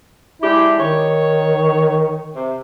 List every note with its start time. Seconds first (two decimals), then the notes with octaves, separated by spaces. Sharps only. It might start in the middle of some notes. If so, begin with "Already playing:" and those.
0.42 G#3 D4 E4 G4
0.79 D#3 C#5
2.35 C3